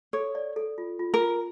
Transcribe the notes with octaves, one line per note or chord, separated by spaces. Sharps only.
A4 C#5
D5
A4
F4
F4
A#4
F4